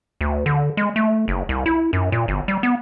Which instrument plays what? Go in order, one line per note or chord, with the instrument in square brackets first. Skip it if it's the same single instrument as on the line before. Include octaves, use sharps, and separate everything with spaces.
[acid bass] D2
D3
G#3
A3
F#1
C2
E4
F#2
A#2
G1
G3
B3